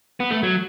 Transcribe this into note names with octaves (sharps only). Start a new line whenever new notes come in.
B3
A3
F#3